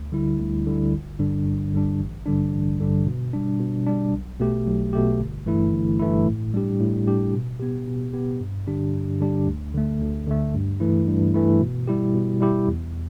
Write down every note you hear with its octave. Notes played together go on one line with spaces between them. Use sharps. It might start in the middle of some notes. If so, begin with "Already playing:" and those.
Already playing: D2
D3 G3 E4
D2
D3 G3 E4
G1
G2 D3 G3 D4
G1
G2 D3 G3 D4
A1
G2 D3 G3 D4
A1
G2 D3 G3 D4
B2
G3 D4
B2
G3 D4
B1
B2 A3 G4
B1
B2 A3 G4
G1
G2 E3 A3 E4
G1
G2 E3 A3 E4
A2
G3 D4 G4
A2
G3 D4 G4
B2
B3 G4
B2
B3 G4
G2
D3 G3 D4 G4
G2
D3 G3 D4 G4
D2
D3 A3
D2
D3 A3
G2
E3 A3 E4
G2
E3 A3 E4
B2
G3 E4 G4
B2
G3 E4 G4
E2